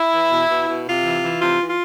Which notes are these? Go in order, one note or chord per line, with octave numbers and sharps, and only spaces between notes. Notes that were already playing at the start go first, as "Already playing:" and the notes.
Already playing: E4
E3
B2
B2
B2
C3 F4
E3
E3
C3 F4
E3
F4